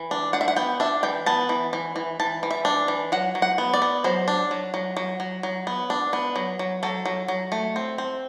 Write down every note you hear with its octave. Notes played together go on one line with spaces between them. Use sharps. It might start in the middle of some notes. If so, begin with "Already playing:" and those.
Already playing: E3
D4
D4 F#5
E5
F#5
B3 G5
D4 E5
E3 G5
B3 A5
E3
E3
E3
E3 A5
E3
E5
D4
E3
F#3 F#5
F#3
F#5
B3
D5
B3
F#3 C5
D4
F#3
F#3
F#3
F#3
F#3
B3
D4
B3
F#3
F#3
F#3 A4
F#3
F#3
A3
C4
C4